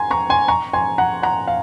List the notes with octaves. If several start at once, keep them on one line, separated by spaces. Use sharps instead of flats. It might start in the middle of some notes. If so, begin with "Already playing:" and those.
Already playing: G#5 A#5 C6
A#5 C#6
G#5 C6
A#5 C#6
G#5 C6
F#5 A#5
F#5 A#5
F5